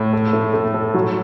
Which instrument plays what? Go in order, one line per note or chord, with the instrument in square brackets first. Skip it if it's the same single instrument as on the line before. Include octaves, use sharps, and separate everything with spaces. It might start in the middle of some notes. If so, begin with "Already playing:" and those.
Already playing: [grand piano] A2
[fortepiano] A4
A3
A3
A4
F#3